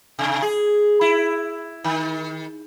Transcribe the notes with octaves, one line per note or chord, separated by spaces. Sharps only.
C3
G#4
E4
D#3